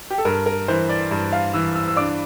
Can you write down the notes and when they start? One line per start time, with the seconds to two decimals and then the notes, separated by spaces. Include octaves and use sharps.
0.10 G4
0.18 A4
0.25 G2 A#4
0.46 A#4
0.68 E3 C5
0.89 D5
1.11 G2
1.32 F5
1.54 E3 E6
1.75 E6
1.88 E6
1.96 D4 D6